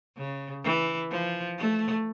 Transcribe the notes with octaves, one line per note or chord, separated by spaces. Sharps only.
C#3
E3
F3
A3